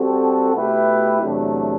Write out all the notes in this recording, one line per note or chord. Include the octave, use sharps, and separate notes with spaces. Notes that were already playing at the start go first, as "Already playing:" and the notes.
Already playing: G3 C4 F#4 A4
B2 A3 E4 G4 B4
E2 C3 F#3 A3 D4